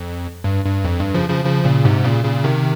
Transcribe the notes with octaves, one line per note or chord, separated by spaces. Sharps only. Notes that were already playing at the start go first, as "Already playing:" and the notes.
Already playing: F2
G2
G2
F2
G2
C#3 F3
C#3 F3
C#3 F3
A#2 C#3
G#2 C3
A#2 C#3
A#2 C#3
C3 D#3